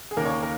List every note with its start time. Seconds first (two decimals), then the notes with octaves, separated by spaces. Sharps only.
0.11 G#4
0.17 D#2 C#3 A#3 A#4
0.25 C#5
0.42 A#4